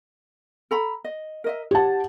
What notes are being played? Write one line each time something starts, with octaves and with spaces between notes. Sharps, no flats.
A4 A#5 B5
D#5
A#4 D#5 E5
G4 C#5 F#5 A5